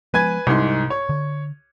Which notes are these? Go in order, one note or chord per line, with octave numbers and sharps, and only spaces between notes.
F3 G#3 B3 B4 G#5 G#6
C2 G#2 C3 C6
C#5
D3